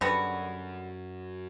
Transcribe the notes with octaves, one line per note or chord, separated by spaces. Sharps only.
F#2 D3 G3 B3 F#4